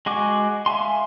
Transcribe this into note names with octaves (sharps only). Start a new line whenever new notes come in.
G#3 F#4 G#5 D6
E5 F5 G#5 C6